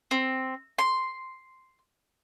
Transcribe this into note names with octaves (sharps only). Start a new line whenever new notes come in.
C4
C6